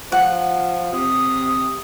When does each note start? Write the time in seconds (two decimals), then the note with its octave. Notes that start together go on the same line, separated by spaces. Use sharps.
0.12 F3 F#5
0.92 C3 D#6